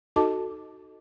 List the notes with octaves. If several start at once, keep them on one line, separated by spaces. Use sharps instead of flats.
D#4 F#4 A4 D#5 A5 D6